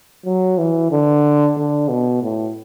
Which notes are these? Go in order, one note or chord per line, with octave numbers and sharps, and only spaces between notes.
F#3
E3
D3
D3
B2
A2